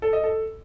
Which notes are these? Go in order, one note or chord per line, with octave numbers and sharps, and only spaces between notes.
A4
D#5
A4